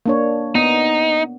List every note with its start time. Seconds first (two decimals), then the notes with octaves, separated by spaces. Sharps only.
0.06 A#3 D4 C#5
0.55 B3 D#4